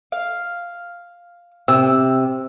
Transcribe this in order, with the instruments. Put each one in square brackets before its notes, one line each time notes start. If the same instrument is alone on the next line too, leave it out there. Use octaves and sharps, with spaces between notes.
[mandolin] F5
[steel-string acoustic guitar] C3 [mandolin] E6